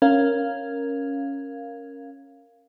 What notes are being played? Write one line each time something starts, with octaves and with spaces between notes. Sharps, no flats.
C#4 A#4 F5